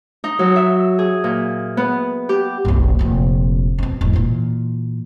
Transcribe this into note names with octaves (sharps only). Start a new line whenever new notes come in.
D#4
F#3
E5
G#4
A#2
B3
G4
F#1 B1
F1 A#2
F2 B2
E1 G#2
A#2 E3